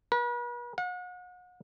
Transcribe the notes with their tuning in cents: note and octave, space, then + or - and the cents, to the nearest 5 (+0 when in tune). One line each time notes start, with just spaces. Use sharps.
B4 -40
F#5 -40